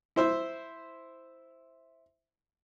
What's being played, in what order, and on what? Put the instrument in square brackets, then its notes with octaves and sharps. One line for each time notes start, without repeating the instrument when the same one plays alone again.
[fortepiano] E4 C5 E5